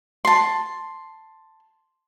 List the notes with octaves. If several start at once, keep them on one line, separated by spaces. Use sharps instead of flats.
A5 C6